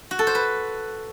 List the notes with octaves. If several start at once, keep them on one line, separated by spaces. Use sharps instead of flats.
F#4
A4
C5
B4